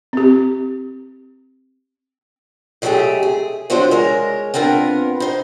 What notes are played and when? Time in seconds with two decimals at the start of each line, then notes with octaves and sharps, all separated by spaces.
0.13 C4 G4
2.82 G#2 F#3 A3 F4 G4 G#4
3.23 G#4
3.70 F3 F#3 D4 F4 F#4 C5
3.91 G#3 A#4 C#5
4.54 B3 C4 D4 F4 A#4
5.20 D#4 C5